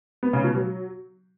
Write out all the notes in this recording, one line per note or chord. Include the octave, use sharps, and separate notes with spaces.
B3
C#3
B2
F#3